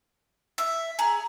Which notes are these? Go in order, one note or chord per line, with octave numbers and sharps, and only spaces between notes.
E5
G#4 A#5